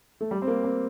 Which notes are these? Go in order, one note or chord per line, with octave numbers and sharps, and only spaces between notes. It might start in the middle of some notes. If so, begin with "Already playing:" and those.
A3
G3
C4
A#3
C4